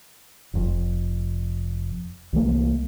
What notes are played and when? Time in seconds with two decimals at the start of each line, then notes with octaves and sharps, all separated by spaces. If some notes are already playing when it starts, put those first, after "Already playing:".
0.54 F1 F2
2.33 C2 E3 A3 A#3